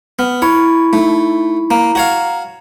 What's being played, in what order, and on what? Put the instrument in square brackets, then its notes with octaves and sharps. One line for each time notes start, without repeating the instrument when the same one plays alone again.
[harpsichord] B3 [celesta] F6
[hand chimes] E4 B5 C#6 [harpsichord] C#5
[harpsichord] A3 [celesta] D#4
[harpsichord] A#3 [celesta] A#5
[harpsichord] F#4 C#5 F5